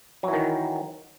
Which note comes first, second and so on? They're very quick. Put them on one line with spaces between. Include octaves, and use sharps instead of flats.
F#3 E3 D#3